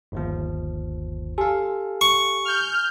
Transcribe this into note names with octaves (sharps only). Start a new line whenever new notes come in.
G1 D#2 F3
G4 A4 F5 G#5
C#6
F6 G6